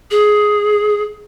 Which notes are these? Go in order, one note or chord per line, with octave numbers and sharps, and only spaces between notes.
G#4